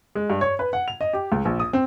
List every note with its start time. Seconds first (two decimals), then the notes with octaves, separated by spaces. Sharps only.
0.15 G#3
0.30 G2
0.41 C#5
0.59 B4
0.73 F#5
0.88 F7
1.01 D#5
1.13 G4
1.32 C#2
1.45 A#1
1.60 D#6
1.73 C4